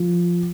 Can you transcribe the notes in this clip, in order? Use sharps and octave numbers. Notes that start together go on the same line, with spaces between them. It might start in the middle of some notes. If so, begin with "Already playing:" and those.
Already playing: F3